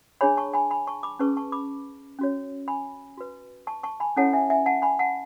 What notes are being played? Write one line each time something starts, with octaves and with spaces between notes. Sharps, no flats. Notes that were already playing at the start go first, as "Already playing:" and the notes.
D4 G#4 C#5 G#5 B5
A5 C#6
G#5 B5
G#5 B5
A5 C#6
B5 D6
C#4 G#4 B4 A5 C#6
A5 C#6
B5 D6
C#4 F#4 C#5
G#5 B5
F#4 B4
A5 C#6
A5 C#6
G#5 B5
C#4 E4 A4 C#5 F#5 A5
E5 G#5
E5 G#5
F#5 A5
G#5 B5
F#5 A5